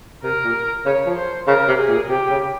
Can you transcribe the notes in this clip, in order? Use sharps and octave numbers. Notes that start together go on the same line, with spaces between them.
C3 A#4
A#2
C#3 C#5
F3
C5
C#3 A#4
C3
G#4
A#2
C3 G4
C#3